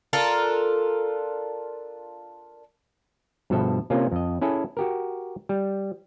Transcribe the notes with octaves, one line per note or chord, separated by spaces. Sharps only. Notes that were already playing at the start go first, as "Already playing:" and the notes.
D4 F4 A4 A#4
G2 B2 F3 A4 E5
C3 A#3 C#4 F4
F2 D#5
C#4 E4 G#4 A4
F#4 G4 A#4
G3